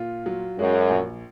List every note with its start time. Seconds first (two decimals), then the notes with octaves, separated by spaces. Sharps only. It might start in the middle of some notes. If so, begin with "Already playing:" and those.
Already playing: A#2 F4
0.26 F#3
0.59 F#2 G#3
0.91 A#1